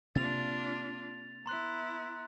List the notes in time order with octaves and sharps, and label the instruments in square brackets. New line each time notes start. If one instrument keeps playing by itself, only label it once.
[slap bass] C3 A#3 [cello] D4 F4 [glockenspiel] A6 F7
[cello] B3 E4 [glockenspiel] A#5 C6 F#6